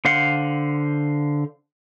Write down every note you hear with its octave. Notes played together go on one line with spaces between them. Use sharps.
D3 C5 F5 F#5